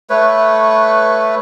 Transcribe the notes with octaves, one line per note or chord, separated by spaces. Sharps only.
A3 B4 C#5